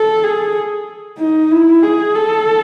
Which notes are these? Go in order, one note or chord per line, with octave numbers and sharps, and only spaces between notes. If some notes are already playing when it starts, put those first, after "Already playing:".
Already playing: A4
G#4
D#4
E4
G#4
A4